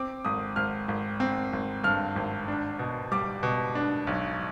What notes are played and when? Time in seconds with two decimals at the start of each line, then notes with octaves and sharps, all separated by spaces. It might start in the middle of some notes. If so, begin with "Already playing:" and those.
Already playing: C4 D6
0.25 G#1 D#6
0.56 G#1 F6
0.88 G#1
1.20 C4
1.53 G#1
1.84 G2 F6
2.16 G#1
2.48 D4
2.79 B2
3.12 G3 D6
3.43 B2
3.75 D4
4.07 B1